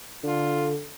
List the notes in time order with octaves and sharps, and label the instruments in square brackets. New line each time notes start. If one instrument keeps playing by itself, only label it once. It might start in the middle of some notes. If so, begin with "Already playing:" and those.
[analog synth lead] D3 [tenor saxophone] F4